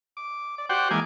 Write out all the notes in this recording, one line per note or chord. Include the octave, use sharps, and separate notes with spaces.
D6
D5
F#4 G4 C5 D5 F#5 G5
E3 G#3 A#3 G#5 D6